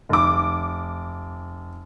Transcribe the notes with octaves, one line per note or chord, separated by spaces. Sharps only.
F1 D6